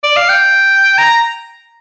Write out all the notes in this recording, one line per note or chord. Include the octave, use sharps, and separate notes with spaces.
D5
F5
G5
A#5